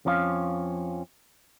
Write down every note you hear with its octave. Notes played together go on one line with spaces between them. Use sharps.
F2 F3 C#4 G4 F5